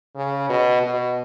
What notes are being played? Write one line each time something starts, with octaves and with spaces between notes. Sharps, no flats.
C#3
B2
B2